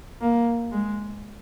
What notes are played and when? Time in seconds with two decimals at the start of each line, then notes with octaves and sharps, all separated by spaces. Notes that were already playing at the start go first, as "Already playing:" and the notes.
0.21 A#3
0.72 G#3